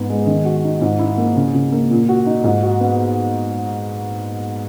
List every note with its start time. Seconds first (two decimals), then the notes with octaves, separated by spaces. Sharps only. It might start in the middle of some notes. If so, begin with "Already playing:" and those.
Already playing: G#2 B3
0.10 G#3
0.27 D#3
0.45 F#4
0.64 D#4
0.82 G#2
0.99 E4
1.18 A#3
1.36 C#3
1.54 C#3
1.72 A#3
1.91 A#2
2.09 F#4
2.26 D#4
2.44 G#2
2.63 F#4
2.80 B3